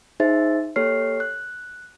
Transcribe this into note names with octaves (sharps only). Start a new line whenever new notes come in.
D#4 G#4 C5 E5 A6
A#3 G4 A4 C#5 F6 C7
F#6